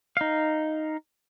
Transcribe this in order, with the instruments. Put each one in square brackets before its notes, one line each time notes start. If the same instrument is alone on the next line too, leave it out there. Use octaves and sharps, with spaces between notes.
[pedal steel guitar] D#4 F5